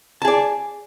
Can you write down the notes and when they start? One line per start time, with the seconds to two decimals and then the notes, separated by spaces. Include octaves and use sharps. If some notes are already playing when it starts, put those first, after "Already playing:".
0.22 A5
0.25 G#4
0.28 D5